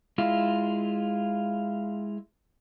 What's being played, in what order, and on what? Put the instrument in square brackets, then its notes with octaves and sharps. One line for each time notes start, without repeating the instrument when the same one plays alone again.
[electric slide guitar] G#3 E4 F4